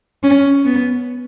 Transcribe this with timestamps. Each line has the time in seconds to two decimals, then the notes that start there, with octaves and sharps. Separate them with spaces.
0.23 C#4
0.66 B3